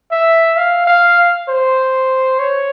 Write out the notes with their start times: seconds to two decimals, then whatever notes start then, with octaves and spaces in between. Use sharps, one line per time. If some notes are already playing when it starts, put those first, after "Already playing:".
0.11 E5
0.57 F5
0.87 F5
1.49 C5
2.39 C#5